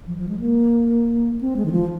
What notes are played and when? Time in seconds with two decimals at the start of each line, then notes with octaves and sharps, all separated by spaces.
0.07 F3
0.18 F3
0.29 G#3
0.40 A#3
1.41 C4
1.57 G#3
1.66 D#3
1.72 F3